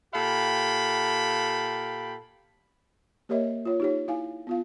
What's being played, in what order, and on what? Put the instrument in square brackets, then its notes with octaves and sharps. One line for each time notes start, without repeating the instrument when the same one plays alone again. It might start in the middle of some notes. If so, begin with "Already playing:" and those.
[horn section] A#2 G4 A4 F5 G5 B5
[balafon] A#3 G4 A#4 C#5 D#5 E5
F4 C#5
D#4 G4 C#5
E4 F5 G#5
B3 F4 F5